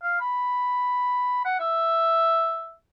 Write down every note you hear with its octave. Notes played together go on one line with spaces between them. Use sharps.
F5
B5
F#5
E5